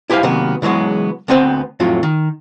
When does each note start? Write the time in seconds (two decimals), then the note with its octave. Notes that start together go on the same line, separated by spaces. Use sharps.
0.10 E4 G4 B4 C5 F5
0.23 C3 D#3 F#3 A#3 B3
0.62 C#3 E3 F#3 G#3 B3
1.28 D2 B3 C4 B4 C5 G5
1.80 F2 A2 F#3 F4
2.03 D#3